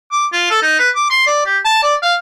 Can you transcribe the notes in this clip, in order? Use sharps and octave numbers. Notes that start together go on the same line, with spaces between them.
D6
F4
A4
D#4
B4
D6
C6
D5
G4
A5
D5
F5